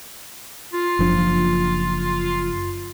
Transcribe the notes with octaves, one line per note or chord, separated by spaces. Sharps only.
F4
F#1 F3 D4